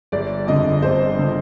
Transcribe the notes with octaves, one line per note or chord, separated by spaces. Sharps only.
G1 D5
F2 D3 D#5
G1 C5
D3